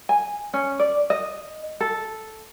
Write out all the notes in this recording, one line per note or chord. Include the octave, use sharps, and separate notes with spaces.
G#5
C#4
D5
D#5
A4